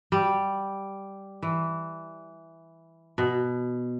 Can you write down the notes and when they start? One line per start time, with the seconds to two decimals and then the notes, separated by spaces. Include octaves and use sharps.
0.12 G3
1.42 E3
3.18 B2